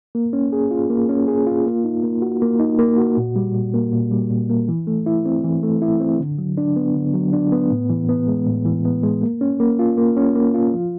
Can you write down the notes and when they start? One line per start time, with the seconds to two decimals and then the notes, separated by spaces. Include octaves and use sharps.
0.15 A#3
0.33 C#4
0.52 G#4
0.71 F4
0.90 A#3
1.09 C#4
1.28 G#4
1.47 F4
1.66 A#3
1.84 D#4
2.03 A#3
2.22 F#4
2.42 A#3
2.60 D#4
2.79 A#3
2.98 F#4
3.17 A#2
3.36 G3
3.55 A#2
3.74 A#3
3.93 A#2
4.11 G3
4.31 A#2
4.50 A#3
4.69 E3
4.87 A3
5.06 E4
5.26 C4
5.44 E3
5.63 A3
5.82 E4
6.00 C4
6.20 D3
6.38 F#3
6.58 D4
6.76 B3
6.96 D3
7.14 F#3
7.33 D4
7.52 B3
7.71 A2
7.90 E3
8.09 B3
8.28 G#3
8.47 A2
8.65 E3
8.85 B3
9.03 G#3
9.22 A#3
9.41 C#4
9.60 A#3
9.79 F4
9.98 A#3
10.17 C#4
10.35 A#3
10.55 F4
10.74 F3